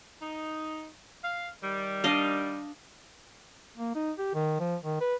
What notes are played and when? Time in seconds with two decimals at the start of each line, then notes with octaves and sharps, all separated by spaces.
0.22 D#4
1.24 F5
1.62 D#3 G3
2.04 D4 D#5 F5
3.78 A#3
3.95 D#4
4.19 G4
4.34 D#3
4.60 F3
4.83 D#3
5.01 B4